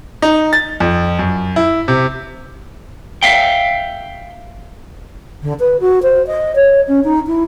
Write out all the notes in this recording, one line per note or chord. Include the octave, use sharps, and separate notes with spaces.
D#4
A6
F2
F#2
E4
C3
E5 F5 G5
D3
B4
F#4
C5
D#5
C#5
C#4
D#4
E4